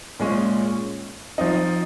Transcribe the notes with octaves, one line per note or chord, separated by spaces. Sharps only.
A#2 G#3 C#4
F3 C4 D#4